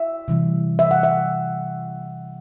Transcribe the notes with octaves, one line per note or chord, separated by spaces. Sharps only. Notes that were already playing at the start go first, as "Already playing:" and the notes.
Already playing: E5
C3 E3 G3
E5
F#5
E5